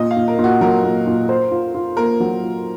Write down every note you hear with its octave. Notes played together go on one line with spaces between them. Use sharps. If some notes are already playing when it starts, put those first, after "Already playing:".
Already playing: A#2 D#5
F5
A#2
A#4
A#2
F#4
F#3 A#4
A#2
A#2
C5
F4
F4
A#3 A#4
F#3
F4